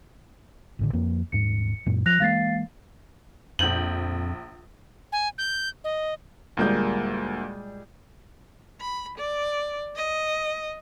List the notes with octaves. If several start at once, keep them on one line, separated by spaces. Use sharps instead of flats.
A1 A2 D3
F2 F3 A#3
D#1 G#2 C#7
F#2 A#2
F3 F#6 A#6 F7
E3 G#3 A#3 F5 A6 C7
A#1 F2 G6 F#7
G#5
G6
D#5
D2 A#2 G3 G#3 A#3 G6
B5
D5
D#5